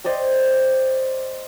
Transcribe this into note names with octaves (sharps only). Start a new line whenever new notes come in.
C5 D5 D#5 G5